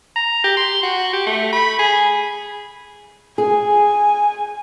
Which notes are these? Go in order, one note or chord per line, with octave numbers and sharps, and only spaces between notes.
A#5
G4
C6
F#4
G4
A3
B5
G#4
G#4 G#5